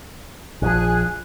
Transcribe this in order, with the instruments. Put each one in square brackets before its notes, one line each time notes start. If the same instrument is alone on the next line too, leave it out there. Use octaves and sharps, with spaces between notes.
[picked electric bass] A#1 F3 [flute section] G#4 G#5 F#6